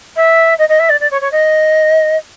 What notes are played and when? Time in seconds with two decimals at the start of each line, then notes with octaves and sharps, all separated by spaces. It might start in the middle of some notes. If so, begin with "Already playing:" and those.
0.16 E5
0.58 D#5
0.69 D#5
0.79 E5
0.89 D5
1.00 D5
1.11 C#5
1.21 C#5
1.31 D#5